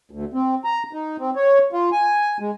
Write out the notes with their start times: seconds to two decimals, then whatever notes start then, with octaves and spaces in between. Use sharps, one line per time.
0.11 D2
0.33 C4
0.64 A#5
0.93 D#4
1.19 C4
1.36 C#5
1.73 F4
1.92 G#5
2.40 G#3